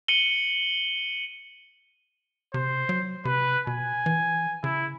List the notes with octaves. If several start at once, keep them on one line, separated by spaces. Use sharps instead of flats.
C#7 D#7 F#7 G7
C3 C5
F#3
C3 B4
B2 G#5
E3
C#3 E4